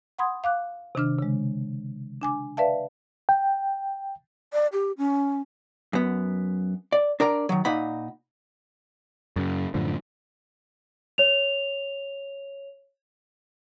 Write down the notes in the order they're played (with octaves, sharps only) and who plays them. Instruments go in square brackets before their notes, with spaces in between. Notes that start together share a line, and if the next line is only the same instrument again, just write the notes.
[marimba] F#5 B5 C6 D#6 G#6
F5 D6 F#6
C3 D#3 D4 F6
C#3 G#3
D4 G#5 D6
B4 D5 E5 F5 A5
[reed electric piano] G5
[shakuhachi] D5
G4
C#4
[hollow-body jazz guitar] F#2 B3
D5
D4 A#4 D5 A#5
D#3 F#3
A#2 D#4 F#5 B5
[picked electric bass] F#2 C#3
F#2 A2 D3 F3
[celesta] C#5 F7